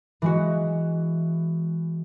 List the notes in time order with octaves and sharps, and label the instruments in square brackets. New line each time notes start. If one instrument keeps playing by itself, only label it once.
[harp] E3 G#3 F#4